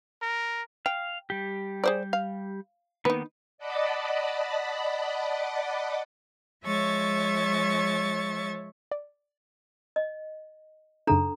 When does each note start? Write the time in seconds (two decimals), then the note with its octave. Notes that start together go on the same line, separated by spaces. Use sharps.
0.22 A#4
0.86 F5 G5
1.30 G3 G4
1.84 G#4 C5 D5
2.13 F5
3.05 D#3 A#3 B3 D#4 B4
3.58 D5 D#5 F#5 A5 B5 D6
6.64 F3 G#3 C#5 E5 C#6 A6
8.92 D5
9.96 D#5
11.07 F#2 C#3 D4 D#4 A4 A#5